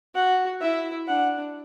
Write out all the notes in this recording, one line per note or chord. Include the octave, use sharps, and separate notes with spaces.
F#4 F#5
E4 E5
D4 F#5